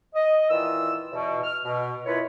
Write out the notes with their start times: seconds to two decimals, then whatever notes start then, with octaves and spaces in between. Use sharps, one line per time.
0.15 D#5
0.50 A#2 D#3 E3 F4 E6
1.12 E2 B2
1.44 F6
1.64 B2
2.06 F#2 B2 E4 F4 B4 C#5